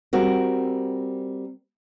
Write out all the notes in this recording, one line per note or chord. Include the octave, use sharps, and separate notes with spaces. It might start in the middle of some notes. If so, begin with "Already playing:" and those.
G3 C4 F#4 A#4